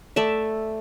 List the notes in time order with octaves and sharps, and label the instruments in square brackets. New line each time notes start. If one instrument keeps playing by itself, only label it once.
[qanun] A3 D5 E5